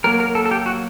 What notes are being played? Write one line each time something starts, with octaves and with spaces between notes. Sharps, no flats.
F#3 A#3 A#4
A#4
A4
A4
G4
F#4